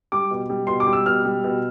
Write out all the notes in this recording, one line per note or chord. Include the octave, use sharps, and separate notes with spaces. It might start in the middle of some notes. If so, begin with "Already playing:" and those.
G3 D6
B2
G3
B2 C6
D6
G3
E6
B2 F6
G3
B2